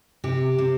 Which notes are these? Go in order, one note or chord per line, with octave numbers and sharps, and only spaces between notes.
C3 G4
C3